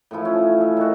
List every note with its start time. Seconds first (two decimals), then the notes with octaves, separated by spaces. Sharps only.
0.11 A2 E3 F3 E4
0.25 C#4
0.61 E5
0.77 D#3 F#4